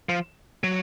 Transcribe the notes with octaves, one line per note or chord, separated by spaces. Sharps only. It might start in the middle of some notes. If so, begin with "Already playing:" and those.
F3
F#3